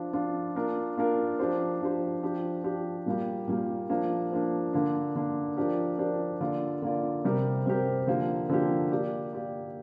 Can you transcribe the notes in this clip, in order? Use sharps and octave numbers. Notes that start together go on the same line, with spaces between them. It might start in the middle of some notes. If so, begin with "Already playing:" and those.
Already playing: F3 D4 F4
F3 D4 F4
A#3 D4 F4 A#4
A#3 D4 F4 A#4
F3 D4 G4 C5
F3 D4 G4 C5
F3 D4 G4
F3 D4 G4
A#2 G3 A#3 G4
A#2 G3 A#3 G4
F3 A#3 D4
F3 A#3 D4
D3 A#3 D4
D3 A#3 D4
F3 D4 G4 A#4 D5
F3 D4 G4 A#4 D5
D3 A#3 F4 D5
D3 A#3 F4 D5
C3 G3 C4 G4 A#4
C3 G3 C4 G4 A#4
D3 F3 A#3 G4
D3 F3 A#3 G4
A#3 G4 D5
A#3 G4 D5